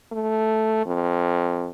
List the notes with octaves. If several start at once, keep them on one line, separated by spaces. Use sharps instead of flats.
A3
F2